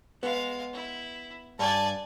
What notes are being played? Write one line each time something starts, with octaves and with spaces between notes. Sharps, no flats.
G#3 B3 F5
E4
G2 D5 G#5 A5